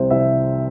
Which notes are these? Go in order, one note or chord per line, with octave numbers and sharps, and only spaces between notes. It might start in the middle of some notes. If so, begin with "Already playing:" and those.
Already playing: C2 C3 G3 C5
C2 E5